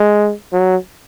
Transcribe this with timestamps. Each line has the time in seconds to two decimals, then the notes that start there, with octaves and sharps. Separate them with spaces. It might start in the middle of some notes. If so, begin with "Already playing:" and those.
Already playing: G#3
0.53 F#3